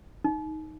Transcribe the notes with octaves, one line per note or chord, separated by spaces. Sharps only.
D#4